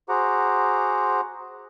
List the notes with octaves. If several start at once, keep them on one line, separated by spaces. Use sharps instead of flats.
F#4 G#4 C5 F#5 A#5 D6